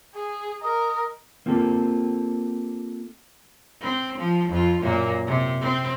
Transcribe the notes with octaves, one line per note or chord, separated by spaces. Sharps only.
G#4
A#4 D#5
A#3 C4 F4 G4 A4
C4
F3
F2 F4
F#2 A#2 A#3
C3
C4